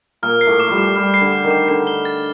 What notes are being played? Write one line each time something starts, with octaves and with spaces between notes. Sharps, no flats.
A#2 A#3 F6
C7
A2 A3
D6
F3 G3
D6
G3 F6
C7
D3
D6
D#3
D6
D3 C7
G7
A6